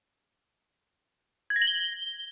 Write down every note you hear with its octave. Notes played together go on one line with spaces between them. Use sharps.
G#6
A#6
F#7
G7